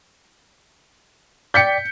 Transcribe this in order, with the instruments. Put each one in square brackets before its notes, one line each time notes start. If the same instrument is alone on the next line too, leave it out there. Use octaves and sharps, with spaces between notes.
[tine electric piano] D5 G5 [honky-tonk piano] G6 B6 C#7